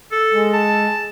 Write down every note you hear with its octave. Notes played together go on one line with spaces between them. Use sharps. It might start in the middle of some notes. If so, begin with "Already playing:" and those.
A4
G#3
A5